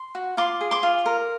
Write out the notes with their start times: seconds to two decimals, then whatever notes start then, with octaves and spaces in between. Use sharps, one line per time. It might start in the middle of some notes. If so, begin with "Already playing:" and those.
Already playing: C6
0.15 F#4
0.37 F4 C6 D6
0.61 G#4
0.71 C6 D6
0.83 F4
1.06 A#4